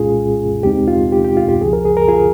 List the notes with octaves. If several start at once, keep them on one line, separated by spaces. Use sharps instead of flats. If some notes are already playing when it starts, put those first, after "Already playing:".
Already playing: C2 A#2 G#3 C#4 F4 G#4
D#2 C#3 G#3 C4 D#4 G4
F4
G4
G4
F4
G4
C#2 C#3 F3 G#4
A#4
G#4
A#4
F4 G#4